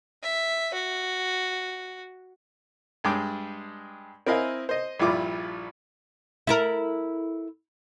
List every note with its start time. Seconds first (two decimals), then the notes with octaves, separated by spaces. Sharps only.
0.23 E5
0.74 F#4
3.04 G2 G#3 D4 G5 D6
4.26 C4 E4 A#4 D#5 F5 G#5
4.69 C5 D#5
5.00 A#1 G2 E4 F4 D6
6.47 E4 A4 A#4